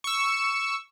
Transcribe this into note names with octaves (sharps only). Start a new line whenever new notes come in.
C#6 E6